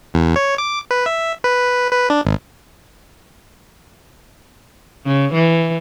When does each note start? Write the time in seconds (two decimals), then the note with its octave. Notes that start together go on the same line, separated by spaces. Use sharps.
0.14 E2
0.36 C#5
0.58 D6
0.91 B4
1.06 E5
1.44 B4
1.91 B4
2.10 D4
2.25 G#1
5.05 C#3
5.33 E3